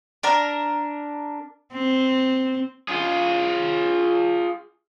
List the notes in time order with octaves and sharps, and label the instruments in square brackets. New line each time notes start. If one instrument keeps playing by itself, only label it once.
[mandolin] D4 A#4
[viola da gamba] C4
[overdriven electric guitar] F4 G#4